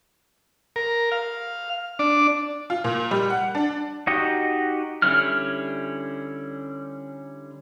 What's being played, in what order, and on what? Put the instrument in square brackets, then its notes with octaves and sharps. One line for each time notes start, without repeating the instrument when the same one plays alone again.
[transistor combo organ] A#4
F5
D4 D5
[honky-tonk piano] F4
A#2
G3
F#5
D4
[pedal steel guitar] D#4 F#4 G4 D#5
D3 G3 C#4 E4 F6